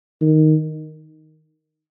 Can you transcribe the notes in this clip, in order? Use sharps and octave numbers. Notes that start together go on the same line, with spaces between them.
D#3